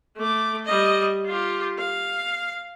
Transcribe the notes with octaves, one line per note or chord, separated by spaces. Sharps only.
A3 D6
G3 D#5
F4 G4
F5